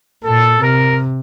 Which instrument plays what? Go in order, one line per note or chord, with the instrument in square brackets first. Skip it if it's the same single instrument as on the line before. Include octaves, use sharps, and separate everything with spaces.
[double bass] A#2 [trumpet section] A4
[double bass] C3 [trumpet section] A#4